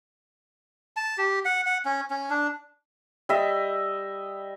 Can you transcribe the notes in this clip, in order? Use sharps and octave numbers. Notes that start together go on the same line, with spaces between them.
A5
G4
F#5
F#5
C#4
C#4
D4
G3 D#5 E5